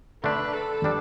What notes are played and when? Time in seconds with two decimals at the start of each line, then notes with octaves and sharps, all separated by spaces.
0.23 D3 A3 D4 B4
0.53 A4
0.84 G3 D4